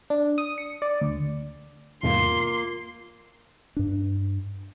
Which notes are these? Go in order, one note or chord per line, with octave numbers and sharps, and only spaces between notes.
D4
D#6
C#7
D5
D2
E2 G#2 C3 A#3 F4 C6
G2 D4